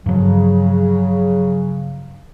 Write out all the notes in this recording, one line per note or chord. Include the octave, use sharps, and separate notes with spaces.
G2 C#3 F3 F#3